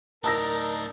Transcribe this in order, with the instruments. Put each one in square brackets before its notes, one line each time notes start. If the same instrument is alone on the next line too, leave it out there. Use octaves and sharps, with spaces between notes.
[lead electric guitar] A2 D4 [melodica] D#4 [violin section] A#4 [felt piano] A5 E6 A#6